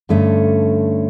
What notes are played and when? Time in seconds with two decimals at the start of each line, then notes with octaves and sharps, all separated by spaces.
0.09 G2 D3 A3 C#4